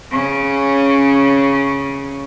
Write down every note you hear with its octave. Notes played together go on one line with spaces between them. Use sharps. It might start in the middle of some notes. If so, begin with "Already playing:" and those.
C#3 C#4